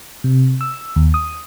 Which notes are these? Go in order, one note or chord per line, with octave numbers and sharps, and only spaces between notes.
C3
E6
D#2
D#6